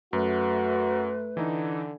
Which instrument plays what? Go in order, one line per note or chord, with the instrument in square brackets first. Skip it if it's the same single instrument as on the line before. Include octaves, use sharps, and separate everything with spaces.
[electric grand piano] F#2 [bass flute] A3 [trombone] F#4 [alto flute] B4
[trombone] D3 [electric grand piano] E3 D#4